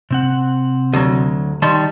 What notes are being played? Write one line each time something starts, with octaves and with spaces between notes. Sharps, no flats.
C3 C4 F#5
D2 F#3
D#3 G3 A5 C6